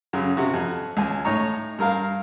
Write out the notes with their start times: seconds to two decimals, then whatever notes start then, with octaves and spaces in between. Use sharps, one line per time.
0.13 F#2 C#3
0.37 C3 F#4
0.54 F2
0.97 C#2 G#5
1.25 A2 D#4 C#5 A#5
1.79 G2 A#4 F5